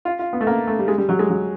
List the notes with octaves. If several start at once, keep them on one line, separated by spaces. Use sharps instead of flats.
F4
F4
B3
A3
A#3
A3
G3
G#3
G3
F#3
G#3
F#3